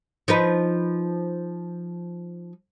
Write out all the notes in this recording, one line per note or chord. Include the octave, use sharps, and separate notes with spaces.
F3 D#4 B4